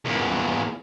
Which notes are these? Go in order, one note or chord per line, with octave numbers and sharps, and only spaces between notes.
E2 A#2